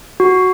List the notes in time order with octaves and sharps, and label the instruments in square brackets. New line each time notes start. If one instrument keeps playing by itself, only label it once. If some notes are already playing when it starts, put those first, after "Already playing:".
[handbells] F#4